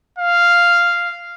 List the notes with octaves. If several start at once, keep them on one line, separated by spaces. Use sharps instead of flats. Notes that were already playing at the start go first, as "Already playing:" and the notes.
F5